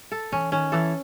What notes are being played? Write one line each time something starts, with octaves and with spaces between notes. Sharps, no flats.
A4
E3 C#4
D#3 C#4
E3 A4